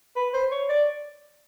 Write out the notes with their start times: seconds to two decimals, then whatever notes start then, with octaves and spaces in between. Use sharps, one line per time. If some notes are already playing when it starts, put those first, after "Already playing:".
0.16 B4
0.34 C5
0.52 C#5
0.69 D5